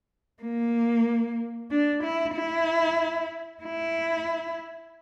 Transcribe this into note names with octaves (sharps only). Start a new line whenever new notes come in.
A#3
D4
E4
E4
E4